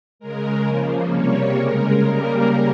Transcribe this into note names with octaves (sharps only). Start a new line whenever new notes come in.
C#3 G#3 A#4
C#3 F3 A#3
C3 G3 A#3 C#5
C#3 G#3 A#4
C#3 G3 A#3 A#4